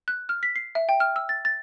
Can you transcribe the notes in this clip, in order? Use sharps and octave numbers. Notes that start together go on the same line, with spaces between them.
F#6
F6
B6
C7
E5
G5
F6
E6
A6
A6